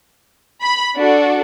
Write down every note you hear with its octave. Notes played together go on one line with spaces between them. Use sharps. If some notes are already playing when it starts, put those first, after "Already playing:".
B5
D4 F#4 A4